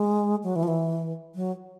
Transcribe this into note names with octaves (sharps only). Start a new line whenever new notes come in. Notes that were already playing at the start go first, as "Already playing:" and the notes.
Already playing: G#3
F#3
E3
F3
E3
F#3